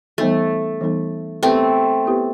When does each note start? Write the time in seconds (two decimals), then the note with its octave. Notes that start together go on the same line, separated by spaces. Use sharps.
0.18 E3 G3 A3 B3 D#4 A4
0.81 E3 G3 B3 D#4 A4
1.43 A3 B3 C4 E4 G4 B4
2.06 B3 E4 G4 B4